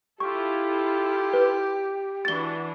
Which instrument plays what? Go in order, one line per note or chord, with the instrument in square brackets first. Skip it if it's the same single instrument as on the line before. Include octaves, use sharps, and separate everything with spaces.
[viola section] E4 F4 A4 [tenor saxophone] G4 [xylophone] C#6
[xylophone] B4
[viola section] E3 D4 F#4 [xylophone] A6 G7